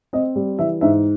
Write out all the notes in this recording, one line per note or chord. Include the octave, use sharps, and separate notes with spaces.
C4 D#5
G3
E3 E5
G#2 E5